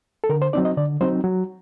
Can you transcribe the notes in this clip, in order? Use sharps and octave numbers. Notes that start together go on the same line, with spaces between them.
A4
D3 A#4
C5
F#3 C4 D#4 D5
D#5
D3 D5
F#3 C4 D#4 C5
F#3